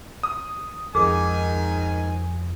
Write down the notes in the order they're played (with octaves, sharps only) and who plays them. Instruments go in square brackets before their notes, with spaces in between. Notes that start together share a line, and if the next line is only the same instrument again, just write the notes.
[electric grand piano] D#6
[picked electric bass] F2 [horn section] G#2 D#3 G#5 [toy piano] G#4